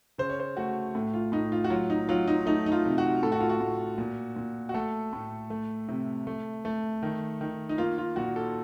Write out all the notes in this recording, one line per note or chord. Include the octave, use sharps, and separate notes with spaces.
C#3 C5
C#5
C5
A3 F#4
A2
F4
A2 D#4
F4
F#4
F#3 F4
D#4
F#3 F4
D#4
A3 D#4
D#4
F4
C3
F#4
A2 A4
F#4
F4
F#4
A2
A#2
A#2
F#4
A3 A4
A2
A3
C3
A3
A3
D#3
D#3
D#4
A#3 F4
F4
A#2 F#4
A4